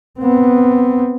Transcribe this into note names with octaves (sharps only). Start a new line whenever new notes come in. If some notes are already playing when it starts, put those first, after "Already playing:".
B3 C4